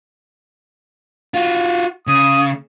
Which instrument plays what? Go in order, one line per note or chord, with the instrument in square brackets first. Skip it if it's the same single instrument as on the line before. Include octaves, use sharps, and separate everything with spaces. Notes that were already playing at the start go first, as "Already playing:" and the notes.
[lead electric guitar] F4 F#4
[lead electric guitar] C#3 [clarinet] D#6